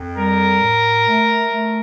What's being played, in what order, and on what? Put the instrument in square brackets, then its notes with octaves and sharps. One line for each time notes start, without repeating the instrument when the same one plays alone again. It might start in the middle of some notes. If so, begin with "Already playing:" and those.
Already playing: [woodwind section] F2
[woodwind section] G3 [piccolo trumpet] A#4
[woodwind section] A2
A3
A3